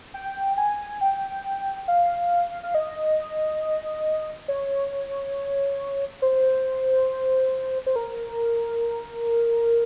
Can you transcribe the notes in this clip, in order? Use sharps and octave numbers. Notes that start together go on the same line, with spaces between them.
G5
G#5
G5
F5
F5
D#5
C#5
C5
C5
A#4